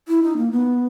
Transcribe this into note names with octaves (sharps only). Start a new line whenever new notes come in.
E4
D#4
A#3
B3